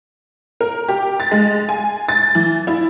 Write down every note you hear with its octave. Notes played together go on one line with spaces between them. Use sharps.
A#4
G4
A6
G#3
G#5
A6
E3
E4